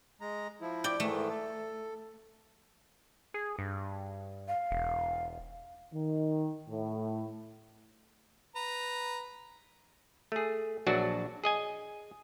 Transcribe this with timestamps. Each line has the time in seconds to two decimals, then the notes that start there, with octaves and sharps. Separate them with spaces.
0.21 G#3 A#5
0.61 F3 E4
0.84 D5 G5
1.00 G#2 D#3 E3 A3
1.30 A4
3.34 G#4
3.59 G2
4.48 F5
4.71 E1
5.94 D#3
6.69 A2
8.56 B4 A#5
10.32 A3 G#4
10.87 A#1 F#3 D4 F#4 E5 A5
11.44 G#4 D#5 G#5